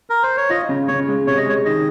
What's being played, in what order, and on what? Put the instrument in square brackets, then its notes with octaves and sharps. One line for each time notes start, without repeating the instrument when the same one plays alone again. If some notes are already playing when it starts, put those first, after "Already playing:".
[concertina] A#4
C5
C#5
[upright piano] F4 [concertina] D#5
[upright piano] C#3
[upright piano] C#3 [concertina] C#5
[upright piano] G#3
[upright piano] C3 [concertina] C#5
[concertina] D#5
[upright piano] G#3 [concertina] C#5
[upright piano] D#3 [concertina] D#5